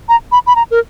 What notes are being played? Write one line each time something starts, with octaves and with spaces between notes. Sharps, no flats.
A#5
B5
B5
A#5
A#4